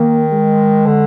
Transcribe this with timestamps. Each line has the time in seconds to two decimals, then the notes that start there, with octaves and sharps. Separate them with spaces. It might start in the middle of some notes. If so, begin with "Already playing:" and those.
Already playing: D#3 A#3
0.31 G#3
0.86 D3